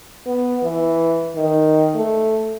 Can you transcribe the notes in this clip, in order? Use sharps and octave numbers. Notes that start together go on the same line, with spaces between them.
B3
E3
D#3
A3